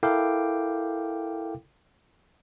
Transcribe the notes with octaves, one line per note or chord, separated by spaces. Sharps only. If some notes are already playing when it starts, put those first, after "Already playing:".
E4 A4 A#4 F5 G5 D6